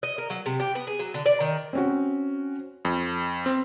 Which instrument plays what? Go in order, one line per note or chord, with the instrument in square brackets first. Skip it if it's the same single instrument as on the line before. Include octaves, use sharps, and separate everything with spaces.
[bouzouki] D#5
A#4
F#3
C3
G4
B3
G#4
F#3
D3
D5
D#3
[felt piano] C4 C#4 F#4
[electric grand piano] F2
C4